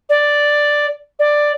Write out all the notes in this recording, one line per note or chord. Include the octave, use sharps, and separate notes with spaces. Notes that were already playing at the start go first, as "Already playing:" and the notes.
D5
D5